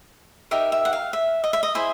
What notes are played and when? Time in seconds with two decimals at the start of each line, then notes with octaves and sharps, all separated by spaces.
0.51 D#4 G4 A#4 E5
0.72 E5
0.85 F#5
0.93 F5
1.13 E5
1.44 D#5
1.53 E5
1.63 D#5
1.75 E4 G#4 C5 D#5 E5